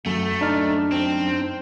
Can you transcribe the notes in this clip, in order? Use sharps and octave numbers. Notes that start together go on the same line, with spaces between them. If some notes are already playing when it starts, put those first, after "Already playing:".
F#2 A3
D4 D#4 F6
C4